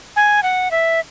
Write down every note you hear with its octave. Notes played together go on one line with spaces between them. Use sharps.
G#5
F#5
E5